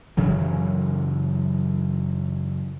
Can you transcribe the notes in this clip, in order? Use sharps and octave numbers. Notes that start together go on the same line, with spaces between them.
F#2 C#3 E3 F#3